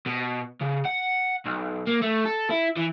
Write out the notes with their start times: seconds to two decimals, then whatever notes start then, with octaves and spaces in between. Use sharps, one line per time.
0.06 B2
0.61 C#3
0.85 F#5
1.45 B1
1.87 A#3
2.02 A3
2.25 A4
2.50 E4
2.77 E3